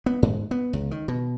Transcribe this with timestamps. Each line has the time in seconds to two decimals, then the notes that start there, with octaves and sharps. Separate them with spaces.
0.06 B3
0.22 G#2
0.51 B3
0.73 C#2
0.91 D#3
1.08 B2